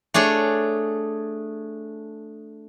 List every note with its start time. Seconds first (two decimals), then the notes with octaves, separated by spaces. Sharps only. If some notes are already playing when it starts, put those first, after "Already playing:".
0.14 A3 D4 G#4 C#5